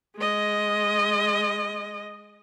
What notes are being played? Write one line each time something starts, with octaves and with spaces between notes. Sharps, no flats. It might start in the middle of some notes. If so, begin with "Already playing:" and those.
G#3 D#5